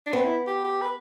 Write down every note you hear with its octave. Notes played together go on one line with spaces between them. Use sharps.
D4
B3 C4
E4
G4
G4
B4